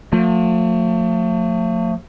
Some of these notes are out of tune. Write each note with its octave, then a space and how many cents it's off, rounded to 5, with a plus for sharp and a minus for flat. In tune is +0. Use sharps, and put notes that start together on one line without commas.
F3 +45 A3 +40